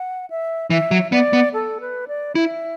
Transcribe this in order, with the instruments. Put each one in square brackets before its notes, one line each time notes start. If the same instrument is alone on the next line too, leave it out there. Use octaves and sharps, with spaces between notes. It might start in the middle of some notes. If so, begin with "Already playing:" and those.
Already playing: [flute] F#5
E5
[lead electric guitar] E3 [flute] E5
[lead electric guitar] F#3
[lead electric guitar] B3 [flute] D5
[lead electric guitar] B3
[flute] A4
B4
D5
[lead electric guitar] E4 [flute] E5